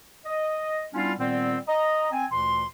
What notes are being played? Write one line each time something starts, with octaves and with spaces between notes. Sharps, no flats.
D#5
G3 B3 C#4 D4 E4 F4
A#2 D#3 G3 B3 C4
D#5 A#5
C4 G#5
D2 A#2 E3 C6